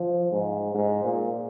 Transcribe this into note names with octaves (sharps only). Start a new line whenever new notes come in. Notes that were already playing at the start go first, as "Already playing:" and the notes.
Already playing: F3
G#2
G#2
A#2